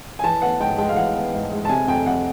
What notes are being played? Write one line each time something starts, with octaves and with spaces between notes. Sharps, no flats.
G#5
E3 A5
B3 F#5
G#2 G5
G#3 G5
F5
E3 F#5
B3
G#2
G#3
A5
C3 G#5
F2 G5
F2 F#5